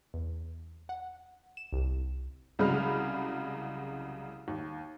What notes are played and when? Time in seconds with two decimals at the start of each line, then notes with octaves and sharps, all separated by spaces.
0.14 E2
0.89 F#5
1.57 E7
1.73 C2
2.59 C2 C#3 F#3 G#3 B5 F6
4.48 D#2